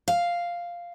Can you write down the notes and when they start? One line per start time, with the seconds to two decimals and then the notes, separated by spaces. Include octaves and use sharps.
0.08 F5